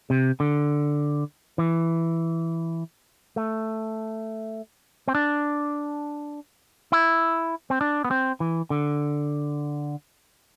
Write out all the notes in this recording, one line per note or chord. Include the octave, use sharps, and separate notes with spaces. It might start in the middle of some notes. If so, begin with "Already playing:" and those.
C3
D3
E3
A3
C4
D4
E4
C4
D4
B3
C4
E3
D3